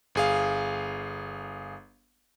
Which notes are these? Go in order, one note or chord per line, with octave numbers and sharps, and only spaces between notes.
G1 G#4 F5